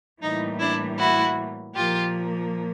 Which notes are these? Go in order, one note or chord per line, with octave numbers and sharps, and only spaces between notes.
A2 E3 G3 A#3 D#4
D4 E4
E4 F#4
A#2 F3 A#3 F4 G4